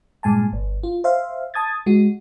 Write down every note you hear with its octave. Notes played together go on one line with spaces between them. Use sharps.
G2 A#2 G#3 G#5 A5
G1
F4
C5 E5 F5
A5 D#6 G#6 A6
G#3 F#4